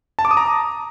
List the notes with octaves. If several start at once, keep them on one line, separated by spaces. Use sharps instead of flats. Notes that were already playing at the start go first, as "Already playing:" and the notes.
A5
D6
D#6
A#5